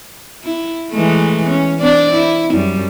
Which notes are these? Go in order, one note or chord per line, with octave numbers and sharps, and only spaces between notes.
E4
E3 G#3 A3
C#4
C4 D4 D5
E4
F#2 G3